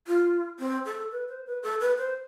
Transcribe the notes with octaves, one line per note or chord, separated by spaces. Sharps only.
F4
C4
A4
B4
C5
B4
A4
B4
C5